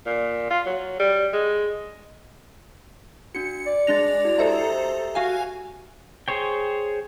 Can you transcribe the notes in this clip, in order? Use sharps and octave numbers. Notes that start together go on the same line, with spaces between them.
A#2
F4
F#3
G3
G#3
D4 F#4 C#7
D5
G#3 D4 A6 A#6 F7
E4 F#4
G4 A4 C5 D#5 E5 A#5
F#4 F5 G#5
G#4 C5 C#5 G5